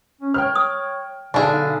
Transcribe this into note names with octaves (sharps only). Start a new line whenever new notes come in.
C#4
C#5 G5 F6
D#6
B1 D3 D4 G#4